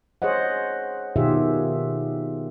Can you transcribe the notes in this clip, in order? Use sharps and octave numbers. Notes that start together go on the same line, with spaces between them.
G#4 C5 C#5 D#5 F#5
B2 D#3 F4 G4 G#4 E5